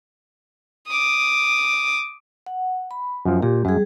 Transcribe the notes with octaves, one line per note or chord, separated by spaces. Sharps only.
D6 D#6
F#5
B5
F#2 F3
A#2 G4
F#2 G3 G#4